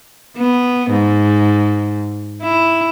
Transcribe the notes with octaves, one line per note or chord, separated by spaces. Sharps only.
B3
G#2
E4